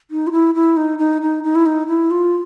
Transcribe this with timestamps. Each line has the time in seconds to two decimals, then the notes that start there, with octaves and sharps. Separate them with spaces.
0.11 D#4
0.27 F4
0.32 E4
0.55 E4
0.77 D#4
0.99 D#4
1.22 D#4
1.44 D#4
1.55 E4
1.66 D#4
1.87 E4
2.11 F4